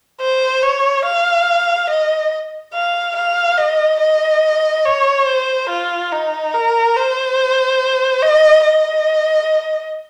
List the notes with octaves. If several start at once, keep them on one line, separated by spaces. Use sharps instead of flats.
C5
C#5
F5
D#5
F5
F5
D#5
D#5
C#5
C5
F4
D#4
A#4
C5
D#5
D#5